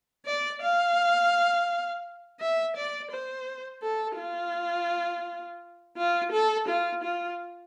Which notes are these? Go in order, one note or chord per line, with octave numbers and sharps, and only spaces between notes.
D5
F5
E5
D5
C5
A4
F4
F4
A4
F4
F4